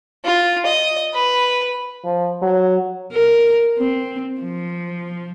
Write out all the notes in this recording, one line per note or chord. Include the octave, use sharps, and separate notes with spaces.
F4
D#5
B4
F3
F#3
A#4
C4
F3